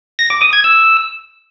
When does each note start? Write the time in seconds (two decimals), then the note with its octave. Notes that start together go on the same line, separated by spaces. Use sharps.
0.19 A#6
0.30 D6
0.42 D#6
0.53 G#6
0.64 E6